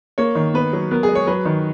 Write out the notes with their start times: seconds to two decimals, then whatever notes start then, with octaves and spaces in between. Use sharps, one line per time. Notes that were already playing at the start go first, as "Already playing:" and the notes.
0.18 A#3 C#5
0.35 D#3
0.54 B3 B4
0.73 F#3
0.91 B3 A#4
1.03 G#4
1.09 G#3
1.15 C#5
1.27 F#3 B4
1.45 D#3